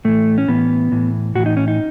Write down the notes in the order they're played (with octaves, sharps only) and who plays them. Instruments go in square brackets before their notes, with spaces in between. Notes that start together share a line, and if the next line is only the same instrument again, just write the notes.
[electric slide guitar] A2 E3 A3
C#4
A2 E3 B3
A2 E3
A2 F#4
E3
D#4
C#4
D#4